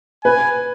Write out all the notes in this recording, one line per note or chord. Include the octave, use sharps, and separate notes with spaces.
B4 G#5